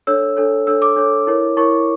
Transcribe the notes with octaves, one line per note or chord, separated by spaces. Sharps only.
D4 A4 C#5 E6
D4 A4 C#5
D4 A4 C#5 E6
D6
D4 A4 C#5
E4 A#4 C#5
E4 A#4 C#5 C#6